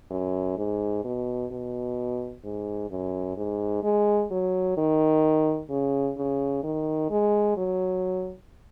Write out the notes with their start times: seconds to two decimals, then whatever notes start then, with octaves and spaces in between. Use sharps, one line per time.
0.11 F#2
0.57 G#2
1.04 B2
1.51 B2
2.44 G#2
2.90 F#2
3.37 G#2
3.83 G#3
4.31 F#3
4.77 D#3
5.70 C#3
6.17 C#3
6.63 D#3
7.10 G#3
7.57 F#3